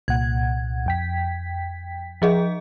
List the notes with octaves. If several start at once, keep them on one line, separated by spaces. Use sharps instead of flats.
C2 A#2 F#5 G#6
F2 G5 B6
F3 G#4 D#5